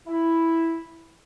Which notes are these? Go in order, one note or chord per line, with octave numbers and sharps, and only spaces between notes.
E4